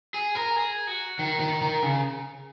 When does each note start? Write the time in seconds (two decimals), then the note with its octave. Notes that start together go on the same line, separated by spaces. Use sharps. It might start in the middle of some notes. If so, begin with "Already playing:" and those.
0.14 G#4
0.35 A#4
0.56 G#4
0.87 F#4
1.19 D#3
1.40 D#3
1.62 D#3
1.83 C#3